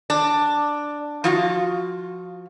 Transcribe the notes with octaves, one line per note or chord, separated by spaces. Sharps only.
D4
F3 F4 F#4